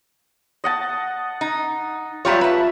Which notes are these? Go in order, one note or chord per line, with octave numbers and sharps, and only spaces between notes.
D#5 F#5 A5
D#4
F#3 G3 F4 C#5 E5
B4 A5